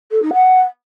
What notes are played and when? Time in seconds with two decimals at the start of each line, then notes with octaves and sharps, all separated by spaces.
0.11 A4
0.22 D#4
0.33 F#5